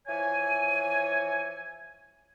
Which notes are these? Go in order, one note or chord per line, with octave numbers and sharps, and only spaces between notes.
E3 F3 C#5 G#5